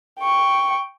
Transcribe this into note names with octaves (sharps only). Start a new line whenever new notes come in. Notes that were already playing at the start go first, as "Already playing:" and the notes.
G5 C#6